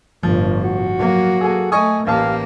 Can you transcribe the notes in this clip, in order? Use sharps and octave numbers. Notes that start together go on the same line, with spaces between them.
G1 A2 F3
F#4
F#3 A#3
G#4 A4 G#5
A3 D#5 G#5 C#6 D#6
A1 A#3 G4 F5 A5